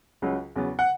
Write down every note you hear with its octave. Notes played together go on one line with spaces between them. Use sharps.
C#2 C#3 F#3
E2 C#3 F#3 B3
F#5